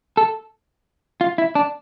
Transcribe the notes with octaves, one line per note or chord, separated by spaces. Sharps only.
A4
F4
E4
D4